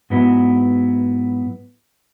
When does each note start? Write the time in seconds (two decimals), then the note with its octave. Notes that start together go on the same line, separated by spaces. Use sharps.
0.10 G#2 F#3 B3 E4